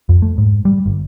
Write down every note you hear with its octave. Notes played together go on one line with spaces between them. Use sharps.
F2
A3
G#2
G3
G1